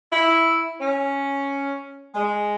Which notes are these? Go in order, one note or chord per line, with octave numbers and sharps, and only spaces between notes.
E4
C#4
G#3